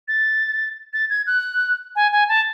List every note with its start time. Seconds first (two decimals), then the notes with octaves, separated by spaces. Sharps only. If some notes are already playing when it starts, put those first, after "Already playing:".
0.08 A6
0.93 A6
1.10 G#6
1.27 F#6
1.96 G#5
2.12 G#5
2.29 A5